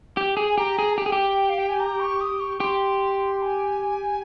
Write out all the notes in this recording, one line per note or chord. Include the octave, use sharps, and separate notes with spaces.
G4
G#4
G#5
G4 A#5
G#4
G#5
G4 G5
G#4
G4
F5
G5
G#5
A#5
C#6
D#6
C#6
G4 C6
G#5